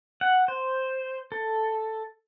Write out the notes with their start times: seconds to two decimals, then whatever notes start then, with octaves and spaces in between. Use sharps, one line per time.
0.21 F#5
0.48 C5
1.32 A4